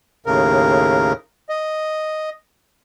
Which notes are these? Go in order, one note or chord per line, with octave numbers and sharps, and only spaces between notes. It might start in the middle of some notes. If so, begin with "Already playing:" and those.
D#2 A2 C#3 A#4
D#5